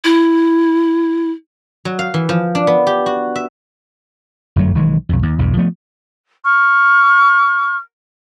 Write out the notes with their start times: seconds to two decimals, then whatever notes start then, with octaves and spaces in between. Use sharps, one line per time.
0.04 E4
1.85 F#3
1.99 F5
2.14 E3
2.29 F3
2.55 D4
2.67 B3
2.87 G4
3.06 F#4
3.36 E5
4.56 G1 F#2 F#3 A3
4.75 B1 D#3 E3 G#3
5.09 B1 F2
5.23 D#2
5.39 B1 E2 G2
5.57 F3 A3 B3
6.44 C#6 F6